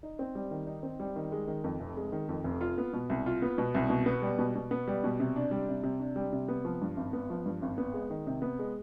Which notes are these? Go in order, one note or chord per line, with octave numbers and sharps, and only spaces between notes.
D#4
C4
G3
D#3
D#4
C4
G3
D#3
G#3
D#3
F2
F1
G#3
D#3
F2
F1
F4
B3
B2
C2
F4
B3
B2
C2
B2
B3
G3
B2
B2
B3
G3
B2
C3
D4
G3
C3
C3
D4
G3
C3
B3
F3
G2
G#1
B3
F3
G2
G#1
B3
G#3
D#3
C3
B3
G#3